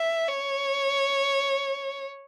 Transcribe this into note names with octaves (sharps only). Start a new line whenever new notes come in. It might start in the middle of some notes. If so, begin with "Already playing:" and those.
Already playing: E5
C#5